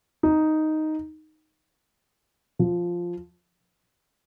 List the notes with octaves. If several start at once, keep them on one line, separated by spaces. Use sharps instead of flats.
D#4
F3